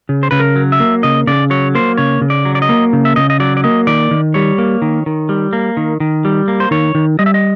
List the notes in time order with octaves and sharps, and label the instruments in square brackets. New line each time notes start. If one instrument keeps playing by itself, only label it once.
[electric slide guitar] C#3
C5
C#3 B4
A#4
F#3
E5
A#3
C#3 D#5
C#3 D5
F#3 C#5
A#3 C5
C#3 C#5
C#3
D5
F#3
D5
D#5
A#3
C#3
E5
C#3 D#5
D#5
F#3 D5
D5
A#3 D#5
D#3 D5
D#3
G3 C#5
A#3
D#3
D#3
G3
A#3
D#3
D#3
G3
A#3
C5
D#3 C#5
D#3
G3 D#5
E5
D#5